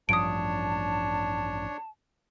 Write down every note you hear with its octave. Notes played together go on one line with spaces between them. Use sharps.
A1 G2 F3 D4 C#5 A5 D#6 D7